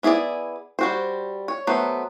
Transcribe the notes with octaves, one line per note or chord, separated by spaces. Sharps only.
B3 E4 G#4 C#5 D5
G3 F#4 C5
C#5
F#3 A3 B3 C5